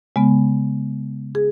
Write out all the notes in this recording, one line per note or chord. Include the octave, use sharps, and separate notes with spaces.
C#3 G#3 B3
G#4